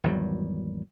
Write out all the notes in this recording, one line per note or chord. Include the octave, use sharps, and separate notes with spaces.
G#1 E2 F#3 G3